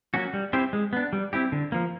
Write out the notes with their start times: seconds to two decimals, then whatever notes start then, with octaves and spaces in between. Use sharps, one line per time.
0.14 F#3 A#3 C#4 F#4
0.33 G3
0.53 C4 E4 G4 C5
0.73 G#3
0.93 B3 D4
1.13 G3
1.33 C4 E4 G4
1.52 D3
1.72 F3 A#3